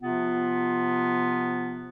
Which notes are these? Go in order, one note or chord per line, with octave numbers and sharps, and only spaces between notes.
C3 F3 B3 F4